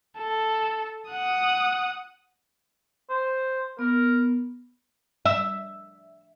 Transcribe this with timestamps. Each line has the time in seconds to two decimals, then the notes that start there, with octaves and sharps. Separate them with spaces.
0.18 A4
1.11 F#5 D#6
3.09 C5
3.79 B3 A#4
5.25 E5